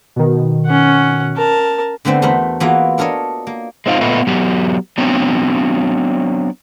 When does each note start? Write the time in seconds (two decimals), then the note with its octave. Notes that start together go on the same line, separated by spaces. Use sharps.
0.16 B2 D#3
0.67 C#4 F#5
1.36 A#4 A5
2.05 D3 A3 B3 C4 C5
2.22 E2 A3 F#4 A#4 C5 B5
2.60 E3 A#3 B3 F4 F#4 G#4
2.98 D4 A4 A#4 C#5 D#5
3.47 A#3
3.86 G#3 C4 D#4 F4
4.01 A#2 A3 B3 F4 B4 D#5
4.27 F#3 B3 F#4 G4
4.98 F#3 B3 C4 D4